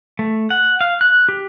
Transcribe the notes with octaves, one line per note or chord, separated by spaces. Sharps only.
A3
F#5
F5
F#6
G4